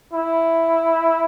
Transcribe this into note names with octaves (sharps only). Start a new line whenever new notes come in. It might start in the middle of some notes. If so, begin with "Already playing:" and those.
E4